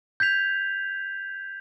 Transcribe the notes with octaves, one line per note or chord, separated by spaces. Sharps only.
G6 G#6 B6 F7